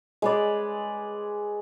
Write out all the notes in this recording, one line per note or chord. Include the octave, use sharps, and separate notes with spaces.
G#3 B4 D5